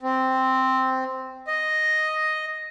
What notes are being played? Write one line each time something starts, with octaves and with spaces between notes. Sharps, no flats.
C4
D#5